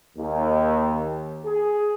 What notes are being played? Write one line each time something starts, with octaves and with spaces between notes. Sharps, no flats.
D#2
G#4